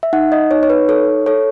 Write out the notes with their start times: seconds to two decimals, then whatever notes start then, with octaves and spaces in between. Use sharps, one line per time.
0.03 E5
0.13 D#4 F#5
0.32 D#5
0.51 D#4 C#5
0.63 C#5
0.70 B4
0.89 A4 C#5
1.26 A4 C#5